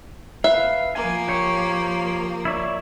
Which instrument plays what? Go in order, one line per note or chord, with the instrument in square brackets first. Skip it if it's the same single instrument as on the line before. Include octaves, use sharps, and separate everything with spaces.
[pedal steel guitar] B4 F5 [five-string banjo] E5
[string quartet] F3 A#3 [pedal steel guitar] G#5
[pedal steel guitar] G4 C#5 C#6
E4 C#5 D5